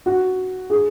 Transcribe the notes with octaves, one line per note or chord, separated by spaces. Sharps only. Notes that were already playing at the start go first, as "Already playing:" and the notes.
F#4
G#4